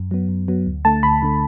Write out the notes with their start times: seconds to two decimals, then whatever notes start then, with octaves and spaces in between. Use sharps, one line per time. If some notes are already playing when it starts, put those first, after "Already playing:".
Already playing: F#2
0.11 F#3 B3
0.29 F#2
0.48 F#3 B3
0.67 D2
0.85 D3 A3 A5
1.03 D2 B5
1.22 D3 A3